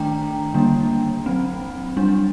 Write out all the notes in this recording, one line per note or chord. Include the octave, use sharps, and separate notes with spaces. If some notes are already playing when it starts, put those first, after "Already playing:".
Already playing: D#3 A3 D4 G5 A#5
D3 G3 A#3 D4
F#3 C4
G3 D4